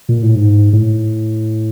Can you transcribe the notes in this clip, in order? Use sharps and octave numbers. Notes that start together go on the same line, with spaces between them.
A#2
A2
G#2
A2